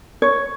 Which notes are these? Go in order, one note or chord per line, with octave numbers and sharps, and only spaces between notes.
C#5